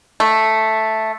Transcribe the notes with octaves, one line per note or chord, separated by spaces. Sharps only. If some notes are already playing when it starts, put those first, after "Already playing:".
A3